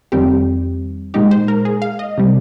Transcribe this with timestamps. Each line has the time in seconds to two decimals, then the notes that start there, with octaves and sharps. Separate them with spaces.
0.12 F2 D#3 G3 C4 G4
1.14 A#2 G#3 D#4 G4
1.31 C5
1.48 A#4
1.65 G#4
1.82 F5
1.99 D#5
2.18 C3 G3